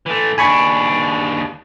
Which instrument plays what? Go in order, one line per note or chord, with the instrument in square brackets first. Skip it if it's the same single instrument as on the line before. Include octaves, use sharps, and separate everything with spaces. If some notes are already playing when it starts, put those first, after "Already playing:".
[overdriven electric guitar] E3 A3
[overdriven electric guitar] D#2 D4 [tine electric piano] G#5 B5 C#6